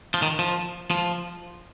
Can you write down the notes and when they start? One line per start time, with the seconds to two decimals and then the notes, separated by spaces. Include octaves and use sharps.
0.14 F3
0.22 D#3
0.39 F3
0.91 F3